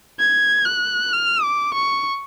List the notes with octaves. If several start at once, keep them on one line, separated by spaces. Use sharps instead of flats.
G#6
F#6
F6
D6
C#6